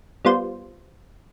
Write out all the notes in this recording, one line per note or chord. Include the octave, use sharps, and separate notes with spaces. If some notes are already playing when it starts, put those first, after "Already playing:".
G3 B3 F4 C5